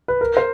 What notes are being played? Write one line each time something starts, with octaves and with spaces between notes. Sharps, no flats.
B4
A#4
C5